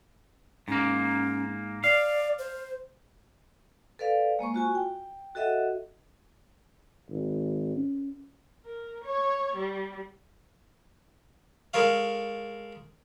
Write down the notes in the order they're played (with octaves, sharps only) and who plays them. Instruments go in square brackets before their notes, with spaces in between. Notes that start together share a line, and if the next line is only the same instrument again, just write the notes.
[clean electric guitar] G#2 A#3 [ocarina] C#4
[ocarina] D5 [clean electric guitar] F5
[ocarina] C5
[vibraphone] A4 B4 D5 F5
G#3 A#3 C5 C#6
F4 F#4 G#5
G5
F#4 A4 D#5 E5 F#5
[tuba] G#1
C#4
[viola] A#4
C#5 C#6
G3
[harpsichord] G#3 A4 A#4 C#5 F5